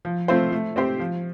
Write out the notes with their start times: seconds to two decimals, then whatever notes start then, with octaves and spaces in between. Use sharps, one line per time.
0.05 F3
0.28 A3 C4 F4 C5
0.52 A3
0.76 C4 G4 C5
0.99 F3